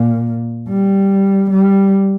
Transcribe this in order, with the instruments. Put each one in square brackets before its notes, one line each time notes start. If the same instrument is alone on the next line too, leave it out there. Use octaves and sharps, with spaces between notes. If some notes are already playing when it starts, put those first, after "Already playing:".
Already playing: [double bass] A#2
G3
G3